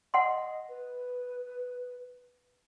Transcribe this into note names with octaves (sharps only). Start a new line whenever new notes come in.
D#5 F#5 C6
B4